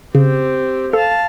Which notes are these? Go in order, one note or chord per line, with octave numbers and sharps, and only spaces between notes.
C#3 C4 G4
A4 F5 A5